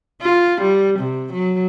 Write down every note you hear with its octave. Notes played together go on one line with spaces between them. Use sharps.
F4
G3
C3
F#3